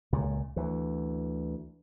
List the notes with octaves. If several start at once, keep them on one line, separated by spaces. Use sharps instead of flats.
C#2 A#2
D2 E3